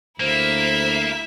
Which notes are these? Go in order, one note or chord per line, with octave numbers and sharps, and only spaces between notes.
D2 A#3 E4 C5 E5